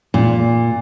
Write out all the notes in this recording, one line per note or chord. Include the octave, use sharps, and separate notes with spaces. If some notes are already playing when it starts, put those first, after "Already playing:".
A#2